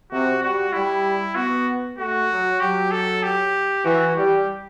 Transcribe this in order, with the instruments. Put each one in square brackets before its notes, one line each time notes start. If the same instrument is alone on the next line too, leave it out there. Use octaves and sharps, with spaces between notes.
[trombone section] C3 [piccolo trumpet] F#4
[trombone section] G3 [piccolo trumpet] F#4
[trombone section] G3 [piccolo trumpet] E4
[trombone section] B3 [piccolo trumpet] F#4
[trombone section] A3 [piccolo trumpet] F#4
[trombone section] F#3
[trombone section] F#3 [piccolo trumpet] G4
[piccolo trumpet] A4
G4
[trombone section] E3 [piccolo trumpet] F#4
[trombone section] G3 [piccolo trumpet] G4